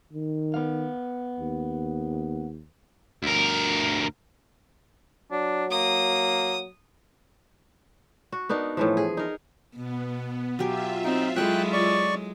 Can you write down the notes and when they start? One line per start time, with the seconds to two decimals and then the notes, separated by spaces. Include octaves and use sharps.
0.13 D#3
0.54 B3 F5
1.40 D#2
3.23 D2 A#4
5.31 F#3 D4
5.71 A#3 D#6
8.32 F#4
8.49 B3 D4 D#4 A#4
8.77 A2 E3 F3
8.97 G#4
9.17 D#4 A#4
9.76 B2 B3
10.59 F#3 F4 G4 E5 G#5
11.04 C4 D#4
11.36 F#3 G#3 E4 A4 C#5 G5 F#6
11.73 D5 C#6